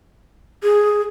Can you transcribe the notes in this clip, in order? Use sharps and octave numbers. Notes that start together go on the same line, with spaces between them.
G#4